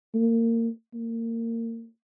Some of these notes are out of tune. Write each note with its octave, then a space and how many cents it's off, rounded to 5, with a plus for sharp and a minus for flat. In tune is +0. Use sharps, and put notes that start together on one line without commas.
A#3 -25
A#3 -30